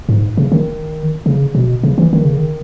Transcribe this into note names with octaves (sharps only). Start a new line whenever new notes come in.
G#2
C#3
D#3
C#3
B2
C#3
E3
D#3
C#3
D#3